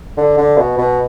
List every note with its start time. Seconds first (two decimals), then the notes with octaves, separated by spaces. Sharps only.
0.17 D3
0.37 D3
0.58 B2
0.78 B2